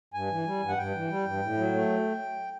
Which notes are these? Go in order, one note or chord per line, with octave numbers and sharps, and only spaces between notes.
G2 G#5
E3
G3
G2
F#5
G2 G5
E3
G3
G2
A2
F#3
A3